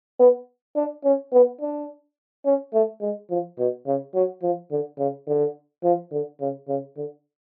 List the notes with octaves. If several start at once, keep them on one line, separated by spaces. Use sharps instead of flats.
B3
D4
C#4
B3
D4
C#4
A3
G#3
F3
B2
C#3
F#3
F3
D3
C#3
D3
F3
D3
C#3
C#3
D3